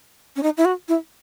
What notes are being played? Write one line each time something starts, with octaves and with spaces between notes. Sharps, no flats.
C#4
D#4
E4
F#4
E4